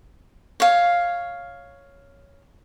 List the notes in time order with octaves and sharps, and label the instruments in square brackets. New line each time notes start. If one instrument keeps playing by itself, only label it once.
[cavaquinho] C#5 F5